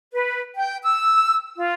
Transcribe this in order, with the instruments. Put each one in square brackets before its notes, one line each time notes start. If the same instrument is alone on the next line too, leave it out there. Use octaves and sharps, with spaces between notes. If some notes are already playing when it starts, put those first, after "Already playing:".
[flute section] B4
G5
E6
F4